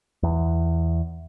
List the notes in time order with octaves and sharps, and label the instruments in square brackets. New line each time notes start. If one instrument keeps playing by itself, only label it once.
[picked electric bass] E2